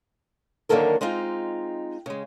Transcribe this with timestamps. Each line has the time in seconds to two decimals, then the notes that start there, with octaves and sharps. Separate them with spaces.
0.69 D3 D#3 F#3 A#3 A4 A#4
1.01 G#3 C4 D#4 F4
2.06 C#3 G#3